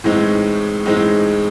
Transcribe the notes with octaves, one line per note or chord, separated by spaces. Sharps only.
A2 E3 G#3 C4 D#4
A2 E3 G#3 C4 D#4